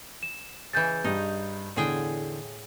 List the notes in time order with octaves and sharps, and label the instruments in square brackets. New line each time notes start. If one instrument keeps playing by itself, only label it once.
[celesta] E7
[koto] C#3 E3 [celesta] G6 A6
[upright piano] G2 [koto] D#4
[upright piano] E2 D3 E3 [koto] A2 G#4 G5